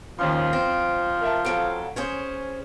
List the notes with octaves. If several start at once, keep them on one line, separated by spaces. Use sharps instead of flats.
D#2 F3 C#4 C6
C4 A#6
A#4 E5 A5
F2 F#3 A4 D7
C#4 G#4 C5 C#5